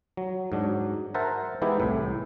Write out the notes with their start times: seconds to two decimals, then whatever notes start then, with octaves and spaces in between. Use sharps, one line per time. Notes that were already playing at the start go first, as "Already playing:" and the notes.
0.17 F#3
0.52 G#2 F#3 D4
1.14 A#4 C5 E5 F#5 A5
1.62 E3 G#3 B3 D#4 E4 G4
1.80 C2 A2